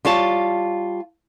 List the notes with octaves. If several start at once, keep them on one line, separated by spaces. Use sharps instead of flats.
G3 F4 C#5 A5